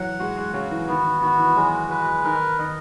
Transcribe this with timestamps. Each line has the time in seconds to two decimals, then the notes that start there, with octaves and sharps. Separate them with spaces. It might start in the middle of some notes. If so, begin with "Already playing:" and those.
Already playing: E3 F#3 F#5
0.19 G#3 F#4
0.37 G#3
0.53 C#3 F#4
0.71 E3
0.88 D#3 B3
1.04 D#3
1.22 D#3 F#4
1.39 E3
1.56 F#3 G#3
1.90 B4
2.24 D#3 A#4
2.59 D#3 D#5